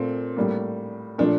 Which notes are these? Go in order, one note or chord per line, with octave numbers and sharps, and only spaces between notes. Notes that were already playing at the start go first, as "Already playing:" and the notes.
Already playing: A#2 A3 C4
A2 G3 A#3
A#2 F3 A3 D4